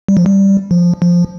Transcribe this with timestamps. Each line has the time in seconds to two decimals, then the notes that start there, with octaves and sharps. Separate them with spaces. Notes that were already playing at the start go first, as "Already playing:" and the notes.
0.08 G3
0.17 F3
0.26 G3
0.71 F3
1.02 F3